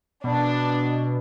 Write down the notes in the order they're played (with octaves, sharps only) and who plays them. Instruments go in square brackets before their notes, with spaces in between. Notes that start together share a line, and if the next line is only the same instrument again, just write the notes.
[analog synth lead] B2 [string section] D4